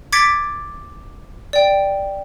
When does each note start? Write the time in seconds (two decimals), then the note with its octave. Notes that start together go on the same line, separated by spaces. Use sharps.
0.13 D6 G#6 A6 B6 C#7 D7
1.53 D5 G5